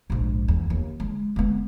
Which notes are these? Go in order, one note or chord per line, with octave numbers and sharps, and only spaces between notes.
A#1 G#2
E2
D#2
G#3
G#3 B3